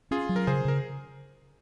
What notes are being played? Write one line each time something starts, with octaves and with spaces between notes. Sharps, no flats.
C#4 F4 G#4
F#3
A#4
C#3 G#4 C5
C#3 A#4